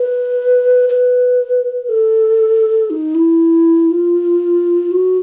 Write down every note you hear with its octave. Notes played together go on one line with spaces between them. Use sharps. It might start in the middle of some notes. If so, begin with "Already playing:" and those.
Already playing: B4
B4
A4
D#4
E4
F4
F#4